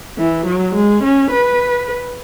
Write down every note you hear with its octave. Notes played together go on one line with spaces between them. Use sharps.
E3
F#3
G#3
C#4
B4